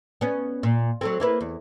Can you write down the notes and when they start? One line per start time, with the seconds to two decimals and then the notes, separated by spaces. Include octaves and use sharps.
0.21 B3 C#4
0.63 A#2
1.01 F#3 A3 C4
1.20 A#3 E4 B4
1.41 E2